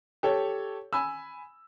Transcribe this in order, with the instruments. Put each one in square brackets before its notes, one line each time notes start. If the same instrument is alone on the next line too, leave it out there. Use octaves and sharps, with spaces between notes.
[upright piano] G4 A4 C#5
G#5 B5 E6